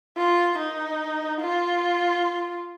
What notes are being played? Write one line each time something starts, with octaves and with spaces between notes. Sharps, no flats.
F4
D#4
F4